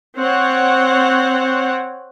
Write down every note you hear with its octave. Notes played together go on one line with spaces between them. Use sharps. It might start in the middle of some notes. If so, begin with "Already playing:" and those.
C4 C#5 F#5